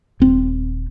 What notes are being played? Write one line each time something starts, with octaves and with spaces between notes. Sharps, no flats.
D#1 C4